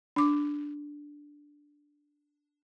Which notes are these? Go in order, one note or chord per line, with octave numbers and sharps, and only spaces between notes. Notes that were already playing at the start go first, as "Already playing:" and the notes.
D4 D6